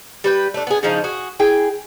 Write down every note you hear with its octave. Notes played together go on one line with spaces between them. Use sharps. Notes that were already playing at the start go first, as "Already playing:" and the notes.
G3 B4 G5
A3 D4
B3 G#4
C#3 E3 F3 D#4
F#4 G#4
E4 G#4 G5